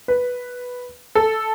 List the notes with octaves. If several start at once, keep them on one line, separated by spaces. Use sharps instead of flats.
B4
A4